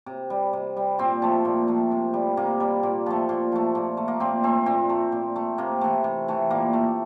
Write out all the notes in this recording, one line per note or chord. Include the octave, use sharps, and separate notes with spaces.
C3
G3
C3
G3
A#2 C4
F3 A3
A#2
F3 A3
C3
G3
C3 A#3
G3
A#2
F3 A3
A#2
F3 A3
A#2
A3
A#3
A#2 C4
A3 C4
A#2 C4
A3
A#2
A3
C3 A#3
E3 A3
C3
E3 A3
A#2 A#3
A3